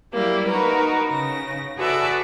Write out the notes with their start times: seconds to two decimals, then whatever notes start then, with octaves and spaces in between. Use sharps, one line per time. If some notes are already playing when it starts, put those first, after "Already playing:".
0.13 F#3 G3 A#3 E4
0.48 D#4 F#4 A#4 B4
1.10 C#3 A#6
1.78 F#4 G#4 A4 B4 D5 E5